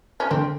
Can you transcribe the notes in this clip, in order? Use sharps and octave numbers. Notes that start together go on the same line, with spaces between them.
C#4
D3 C4